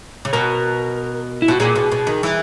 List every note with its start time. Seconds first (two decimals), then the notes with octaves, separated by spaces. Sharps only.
0.25 C#3
0.33 B2 A#4
1.42 E4
1.48 B2 F#4
1.60 A#2 G#4
1.76 B2
1.91 B2
2.07 D#3
2.23 E3